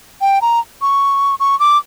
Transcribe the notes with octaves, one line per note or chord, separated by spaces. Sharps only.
G5
A#5
C#6
C#6
D6